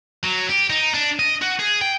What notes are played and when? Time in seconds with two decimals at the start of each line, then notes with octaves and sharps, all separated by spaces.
0.23 F#3
0.49 G4
0.70 D#4
0.94 D4
1.19 D#5
1.41 F#4
1.59 G#4
1.81 G5